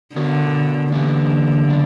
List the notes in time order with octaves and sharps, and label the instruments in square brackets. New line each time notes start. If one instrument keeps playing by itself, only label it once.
[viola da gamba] D3 [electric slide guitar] B3 F#4 A#4 C#5
[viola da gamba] D3 [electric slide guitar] E3 A#3 C#4 G4 B4
[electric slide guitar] C#3 F#3 B3 D4